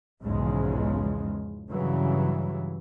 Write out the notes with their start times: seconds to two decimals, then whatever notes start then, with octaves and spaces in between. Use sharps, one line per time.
0.23 B1 E2 G#2 C#3 F3 G#3
1.71 G2 C#3 E3 F#3